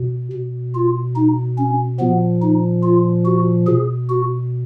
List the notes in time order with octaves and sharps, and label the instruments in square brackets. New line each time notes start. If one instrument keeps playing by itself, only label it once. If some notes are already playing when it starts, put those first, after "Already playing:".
Already playing: [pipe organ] B2
B2
F4
D#4
C#4
A#2 F3 B3
D#4
F4
F#4
B2 G#4
F#4